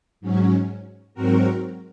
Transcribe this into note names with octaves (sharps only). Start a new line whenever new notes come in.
G#2 F#3 C#4
G#2 F#3 C4 F#4 A#4